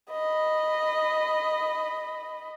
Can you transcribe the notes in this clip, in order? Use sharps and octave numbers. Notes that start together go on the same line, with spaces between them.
D#5 B5